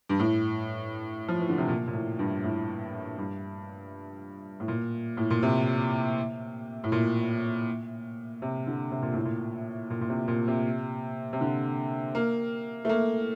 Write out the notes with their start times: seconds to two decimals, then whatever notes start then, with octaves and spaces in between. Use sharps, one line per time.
0.09 G2
0.19 A2
1.28 F3
1.39 E3
1.49 D3
1.58 C3
1.68 A#2
1.88 A#2
1.93 A2
2.19 G2
2.44 A2
3.18 G2
4.60 A2
4.68 A#2
5.17 A2
5.30 A#2
5.43 C3
6.84 A2
6.92 A#2
8.42 C3
8.67 D3
8.92 C3
9.02 A#2
9.13 A2
9.25 A#2
9.90 A#2
10.01 A#2
10.09 C3
10.28 A#2
10.48 C3
11.33 C3
11.41 D3
12.15 A#3
12.85 A3
12.89 A#3